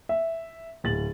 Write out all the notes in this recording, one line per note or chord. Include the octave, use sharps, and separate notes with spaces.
E5
D1 A6 F#7